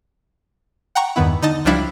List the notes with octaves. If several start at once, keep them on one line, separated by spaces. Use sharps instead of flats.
F#5 G5 A#5 C#6
E2 G2 D#3 B3 E4
D3 D#4 D#5 A5
C#2 F3 G3 D4 E4 F5